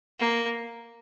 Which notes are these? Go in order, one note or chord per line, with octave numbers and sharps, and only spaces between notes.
A#3